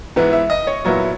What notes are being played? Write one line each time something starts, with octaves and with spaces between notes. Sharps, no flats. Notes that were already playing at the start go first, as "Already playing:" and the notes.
G#2 E3 B3 E4
E5
D#5
C#5
A#2 F#3 B3 E4